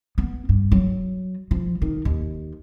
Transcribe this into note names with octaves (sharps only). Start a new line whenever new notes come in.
B3
G2
F#3
F3
D#3
D#2